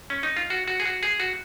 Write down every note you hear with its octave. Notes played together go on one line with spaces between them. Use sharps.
C#4
D#4
F4
F#4
F#4
G#4
F#4
G#4
F#4